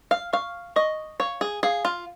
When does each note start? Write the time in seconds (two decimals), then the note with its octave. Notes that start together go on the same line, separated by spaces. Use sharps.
0.11 F5
0.33 F5 C#6
0.76 D#5 C#6
1.20 C#5 F5
1.41 G#4
1.63 G#4 F5
1.85 F4